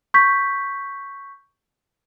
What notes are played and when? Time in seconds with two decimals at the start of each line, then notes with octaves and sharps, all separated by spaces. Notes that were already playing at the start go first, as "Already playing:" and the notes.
0.14 C#6 G6 B6